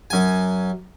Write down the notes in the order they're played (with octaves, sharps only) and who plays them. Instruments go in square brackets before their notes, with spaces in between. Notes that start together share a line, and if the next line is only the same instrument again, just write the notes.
[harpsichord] F#2 G#5